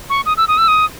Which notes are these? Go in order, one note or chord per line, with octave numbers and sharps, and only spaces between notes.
C#6
D#6
E6
D#6
E6
D#6